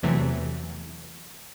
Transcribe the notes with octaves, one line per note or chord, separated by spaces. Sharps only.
E2 C3 E3 F#3 A3